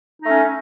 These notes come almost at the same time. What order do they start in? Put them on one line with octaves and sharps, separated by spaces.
D#4 A3 C#4